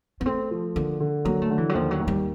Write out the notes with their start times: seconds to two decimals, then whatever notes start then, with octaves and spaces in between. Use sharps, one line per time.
0.21 B3
0.26 A3 C4
0.51 F3
0.76 D3 A#3
1.00 D3
1.25 F#3 A#3
1.42 A3
1.50 D3
1.58 E3
1.69 F#3
1.74 D#2 F3
1.91 F#3
2.00 D#2
2.08 G3